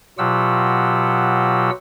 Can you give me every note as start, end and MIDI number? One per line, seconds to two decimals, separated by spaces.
0.18 1.70 47
0.18 1.70 54
0.18 1.70 65
0.18 1.70 67
0.18 1.70 78
0.18 1.70 88